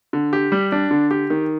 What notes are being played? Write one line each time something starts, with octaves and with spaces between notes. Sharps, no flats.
D3
G4
G3
D4
D3
G4
D#3